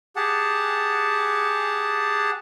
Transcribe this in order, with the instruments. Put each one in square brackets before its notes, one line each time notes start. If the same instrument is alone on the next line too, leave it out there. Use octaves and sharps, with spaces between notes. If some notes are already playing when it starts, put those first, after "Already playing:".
[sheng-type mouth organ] G4 G#4 F#5 A5